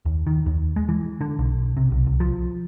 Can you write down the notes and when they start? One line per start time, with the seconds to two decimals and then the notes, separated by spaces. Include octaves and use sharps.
0.05 D#2
0.27 D#3
0.46 D#2
0.76 G#3
0.89 E3
1.21 D3
1.39 B1
1.77 C3
1.92 B1
2.07 C2
2.20 F3